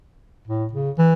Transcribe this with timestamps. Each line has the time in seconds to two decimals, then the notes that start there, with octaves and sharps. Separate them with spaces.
0.47 A2
0.73 C#3
0.98 E3